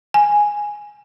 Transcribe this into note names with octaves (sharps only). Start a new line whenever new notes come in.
G#5